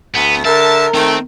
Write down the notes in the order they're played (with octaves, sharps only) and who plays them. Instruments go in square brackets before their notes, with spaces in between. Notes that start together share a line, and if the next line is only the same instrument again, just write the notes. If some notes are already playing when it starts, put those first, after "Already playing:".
[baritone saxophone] D2 [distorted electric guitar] B3
[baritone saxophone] D3 [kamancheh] A#4 [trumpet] E5 [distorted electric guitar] A5
[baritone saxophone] D#3 [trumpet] A3 [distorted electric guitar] C4